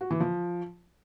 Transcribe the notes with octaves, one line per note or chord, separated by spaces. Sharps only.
F#4
E3
F3